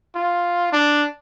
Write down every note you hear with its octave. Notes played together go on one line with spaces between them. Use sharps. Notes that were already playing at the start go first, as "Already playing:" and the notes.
F4
D4